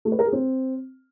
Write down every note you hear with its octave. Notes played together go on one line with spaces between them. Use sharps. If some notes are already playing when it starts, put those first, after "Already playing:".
A3
B4
A#4
G#4
C4